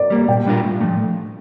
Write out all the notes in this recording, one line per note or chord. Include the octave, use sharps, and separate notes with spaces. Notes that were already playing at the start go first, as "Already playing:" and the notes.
Already playing: A#4 D5
G3 A#3
A#2 G5
G3 D4 F4 A#4
A2
F3 A3